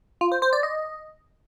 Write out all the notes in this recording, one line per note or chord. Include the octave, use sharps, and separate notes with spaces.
F4
C5
C5
D5
D#5